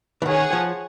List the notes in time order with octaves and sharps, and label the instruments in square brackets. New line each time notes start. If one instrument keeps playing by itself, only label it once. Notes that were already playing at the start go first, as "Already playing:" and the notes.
[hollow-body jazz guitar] E3
[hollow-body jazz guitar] D#3 [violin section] G#4 C#5 F#5
[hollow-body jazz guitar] F3